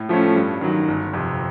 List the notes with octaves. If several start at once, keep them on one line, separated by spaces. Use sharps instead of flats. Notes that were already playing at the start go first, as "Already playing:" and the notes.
Already playing: A2
F3 A3 C#4
G2
D#3 F#3
G1
F2 C3